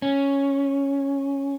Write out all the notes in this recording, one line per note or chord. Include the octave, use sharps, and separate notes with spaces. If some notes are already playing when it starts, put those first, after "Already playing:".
C#4